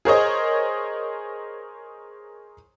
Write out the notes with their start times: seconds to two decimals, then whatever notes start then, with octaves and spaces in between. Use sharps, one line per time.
0.05 G#4 A#4 C5 C#5 D#5